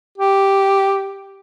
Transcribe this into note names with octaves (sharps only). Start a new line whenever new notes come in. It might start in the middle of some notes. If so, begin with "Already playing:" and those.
G4